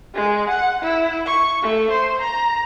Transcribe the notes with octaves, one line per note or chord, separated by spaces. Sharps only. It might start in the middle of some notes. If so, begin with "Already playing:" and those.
G#3
F#5
E4
C#6
A3
C5
A#5